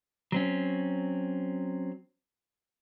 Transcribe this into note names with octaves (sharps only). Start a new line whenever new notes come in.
F#3 C4 C#4